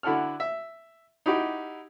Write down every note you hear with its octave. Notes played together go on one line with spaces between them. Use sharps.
D3 E4 F#4 A4 F6
E5
D#4 E4 F#4 G4